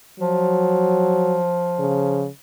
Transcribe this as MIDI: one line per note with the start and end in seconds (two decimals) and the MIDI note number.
0.19 2.26 53
0.19 1.40 54
1.79 2.28 49